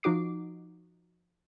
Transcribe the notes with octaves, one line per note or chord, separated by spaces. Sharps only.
F3 D#4 F#4 D6 C7